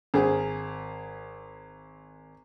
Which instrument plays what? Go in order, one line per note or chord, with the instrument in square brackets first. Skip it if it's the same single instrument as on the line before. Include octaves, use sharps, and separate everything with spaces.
[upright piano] G#1 G#4